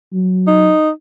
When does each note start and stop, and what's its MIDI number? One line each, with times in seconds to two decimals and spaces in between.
0.13 0.71 54
0.47 0.90 63